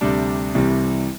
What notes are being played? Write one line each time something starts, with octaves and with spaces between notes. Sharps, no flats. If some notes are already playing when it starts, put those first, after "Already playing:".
D2 C3 G3 D4
C2 C3 E3 G3